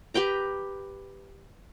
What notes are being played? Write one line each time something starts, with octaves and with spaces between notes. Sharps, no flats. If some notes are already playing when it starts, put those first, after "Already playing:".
G4 B4 G5 A#5